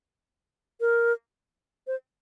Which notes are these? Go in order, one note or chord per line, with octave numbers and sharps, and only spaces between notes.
A#4
C5